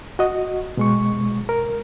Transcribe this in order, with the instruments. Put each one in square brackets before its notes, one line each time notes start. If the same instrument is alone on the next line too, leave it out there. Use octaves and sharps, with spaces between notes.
[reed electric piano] F#4 D#5
B2 G#3 C#6
A#4